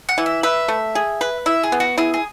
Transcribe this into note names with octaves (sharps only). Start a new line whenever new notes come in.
F#5
E3
E5
B4 E5
A3
G#4
B4
E4 E5
G#4
B3
F#4
E4 G#4
G#4